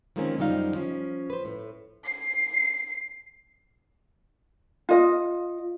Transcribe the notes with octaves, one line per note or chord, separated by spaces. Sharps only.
D#3 F3 G#3 A#3 C4 C#4
F#2 D#3 F3 G3 D#4 F5
F3 C#4
B4 C5
A2
C7
F4 D#5